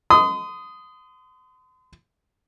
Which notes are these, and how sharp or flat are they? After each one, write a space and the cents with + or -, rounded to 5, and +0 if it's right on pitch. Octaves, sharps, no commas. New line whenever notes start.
C6 -40 D#6 +0